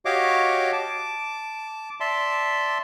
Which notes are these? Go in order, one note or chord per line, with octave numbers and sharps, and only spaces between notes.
F#4 G4 C#5 D#5 F5 D6
A5 D6
D5 E5 A5 C6